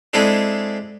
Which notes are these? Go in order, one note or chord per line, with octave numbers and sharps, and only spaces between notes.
G#3 C4 D4 E4 G#4 A4